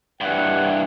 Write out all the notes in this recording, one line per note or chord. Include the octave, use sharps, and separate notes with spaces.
G2 E3 F#5